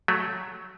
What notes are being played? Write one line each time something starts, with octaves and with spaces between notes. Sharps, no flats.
F#3 A3